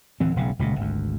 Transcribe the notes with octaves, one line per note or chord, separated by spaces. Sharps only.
D1 E3 C4
E1 B1 C#3
D#1 C#2 A#2
G#1 D2